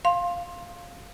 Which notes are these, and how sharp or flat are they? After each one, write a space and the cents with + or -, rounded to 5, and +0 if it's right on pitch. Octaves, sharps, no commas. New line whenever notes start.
F5 +0 C6 +20